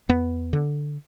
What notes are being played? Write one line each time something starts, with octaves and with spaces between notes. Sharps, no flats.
E2 B3
D3